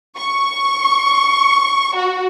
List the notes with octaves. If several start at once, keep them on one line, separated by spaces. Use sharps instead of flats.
C#6
F#4